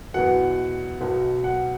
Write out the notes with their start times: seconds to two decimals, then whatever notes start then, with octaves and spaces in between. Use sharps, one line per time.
0.14 E2 B2 F#3 F#5
1.01 B1 B2 F#3
1.44 F#5